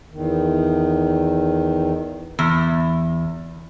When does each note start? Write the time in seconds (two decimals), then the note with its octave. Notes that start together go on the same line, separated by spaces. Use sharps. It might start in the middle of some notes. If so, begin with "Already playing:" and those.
0.11 E2 D#3
2.39 E2